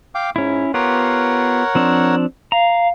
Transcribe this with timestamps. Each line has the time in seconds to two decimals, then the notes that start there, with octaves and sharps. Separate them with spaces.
0.15 F5 G5 D6
0.36 G#2 C#4 E4
0.74 B3 F4 G4 A#4 C#5 F#5
1.75 F3 C4 D4
2.52 F5 A#5